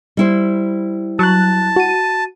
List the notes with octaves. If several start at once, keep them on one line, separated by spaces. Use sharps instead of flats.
G3 E4 C5
F#3 A5 F#6
F#4 D#7